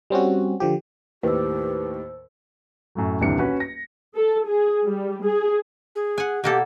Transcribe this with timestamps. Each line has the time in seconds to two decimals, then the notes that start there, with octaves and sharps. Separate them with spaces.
0.10 G3 C4 C#4 F#4
0.60 D3 F3 G4
1.23 D#2 A2 D#3 G4 B4 C5 E6
2.95 F#2 A2 F#3
3.21 D#1 C2 E3 D4 C#7
3.39 C#4 F#4 B4
3.60 A#6
4.15 A4
4.48 G#4
4.85 G3
5.24 G#4
5.96 G#4
6.18 F#5 G#5
6.44 B2 A#3 G4 A4